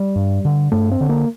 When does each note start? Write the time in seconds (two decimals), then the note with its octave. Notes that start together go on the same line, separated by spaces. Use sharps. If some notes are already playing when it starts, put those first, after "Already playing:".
Already playing: G3
0.16 G2
0.45 D3
0.72 G2 A3
0.92 C4
1.01 D3
1.09 A#3